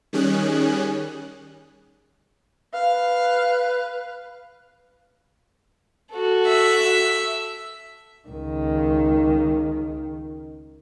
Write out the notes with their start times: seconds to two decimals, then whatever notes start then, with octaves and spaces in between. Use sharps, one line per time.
0.13 D#3 G3 C#4 G#4 F#6
2.74 B4 F5
6.12 F#4 A4
6.47 E5
8.28 C#2 D#3